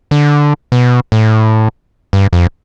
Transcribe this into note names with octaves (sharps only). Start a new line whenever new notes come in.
D3
B2
A2
G2
F2